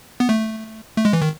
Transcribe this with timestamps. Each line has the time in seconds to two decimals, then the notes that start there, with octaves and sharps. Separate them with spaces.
0.20 B3
0.29 A3
0.97 A3
1.05 G#3
1.13 E3
1.22 D#3